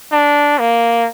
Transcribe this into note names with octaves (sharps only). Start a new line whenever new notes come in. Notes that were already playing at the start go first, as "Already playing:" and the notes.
D4
A#3